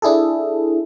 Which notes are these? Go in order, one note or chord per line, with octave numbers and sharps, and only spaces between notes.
D4 E4 G#4 A4